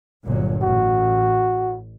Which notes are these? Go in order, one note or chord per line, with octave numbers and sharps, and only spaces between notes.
G1 A#2 F#3
A1 F#4